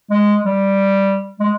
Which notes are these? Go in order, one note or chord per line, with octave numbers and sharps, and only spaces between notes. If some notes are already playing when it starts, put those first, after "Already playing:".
G#3
G3
G#3